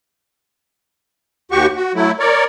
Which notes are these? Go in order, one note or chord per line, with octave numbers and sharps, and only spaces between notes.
D#2 F#4 G4 C#6
F#4
F#3 A3 E4
A#4 C#5 D5